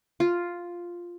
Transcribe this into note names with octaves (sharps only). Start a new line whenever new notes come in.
F4